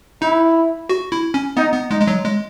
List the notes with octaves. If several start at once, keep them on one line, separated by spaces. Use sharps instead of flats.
D#4 E4
F#4
E4
C#4
B3 D#4
B3
G#3 D#4
G#3
F#3
G#3